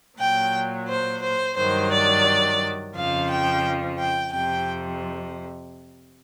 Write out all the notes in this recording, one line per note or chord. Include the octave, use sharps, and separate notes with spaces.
A#2 F#3 G5
C5
C5
G2 D#3 F#3 C5
D5
F2 C#3 F3 F5
G5
G5
F2 C3 G5